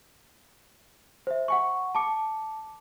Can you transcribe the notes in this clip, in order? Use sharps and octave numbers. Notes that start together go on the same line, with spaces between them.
C5 E5
F#5 G#5 C#6
A5 B5 D6 C#7